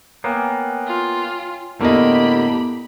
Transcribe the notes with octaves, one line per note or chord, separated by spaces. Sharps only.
A#3 B3 C#5 G5 G#5
F4
A2 D3 A#3 B3 E4 G4 D#5 B5